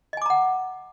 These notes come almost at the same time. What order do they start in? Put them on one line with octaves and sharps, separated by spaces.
D#5 G#5 D6 A#5 F#5